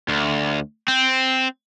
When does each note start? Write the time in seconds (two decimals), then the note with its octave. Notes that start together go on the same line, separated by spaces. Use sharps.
0.09 D2
0.88 C4